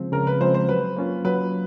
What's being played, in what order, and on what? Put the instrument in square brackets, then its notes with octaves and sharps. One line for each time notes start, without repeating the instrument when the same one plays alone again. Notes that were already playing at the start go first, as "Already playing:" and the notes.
Already playing: [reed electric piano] C#3 F3 G#3 C4
[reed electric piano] C#3 [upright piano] A#4
[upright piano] B4
[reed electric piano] F3 G#3 C4 [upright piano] C5
[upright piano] C5
[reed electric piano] F#3 [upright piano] B4
[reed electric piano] A#3 C#4 F4
[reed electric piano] F#3 [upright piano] B4